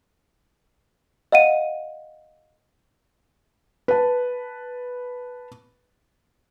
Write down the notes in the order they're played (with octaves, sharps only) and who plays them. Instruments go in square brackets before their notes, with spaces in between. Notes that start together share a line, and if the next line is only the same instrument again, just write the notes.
[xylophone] D#5 F5 F#5 D#7
[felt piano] B4 A5